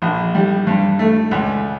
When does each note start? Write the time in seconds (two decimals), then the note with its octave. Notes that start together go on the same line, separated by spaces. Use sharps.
0.02 A#1
0.35 G3
0.67 G2
0.99 A3
1.31 C#2